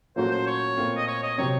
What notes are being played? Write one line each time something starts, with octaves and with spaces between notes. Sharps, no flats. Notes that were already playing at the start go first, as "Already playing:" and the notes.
A#2 F#3 A3 C#4 F#4 C5
C5
C#5
A#2 A3 C4 F4
D#5
C#5
D#5
C3 F#3 C4 C#5